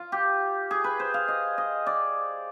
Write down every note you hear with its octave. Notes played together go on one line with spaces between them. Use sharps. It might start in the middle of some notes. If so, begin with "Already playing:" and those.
Already playing: F4
G4
G#4
B4
C5
F5
D#5
D#5
D5